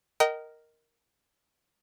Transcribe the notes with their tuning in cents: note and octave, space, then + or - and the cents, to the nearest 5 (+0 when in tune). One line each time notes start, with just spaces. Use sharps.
A#4 +0 D#5 +0 G5 -35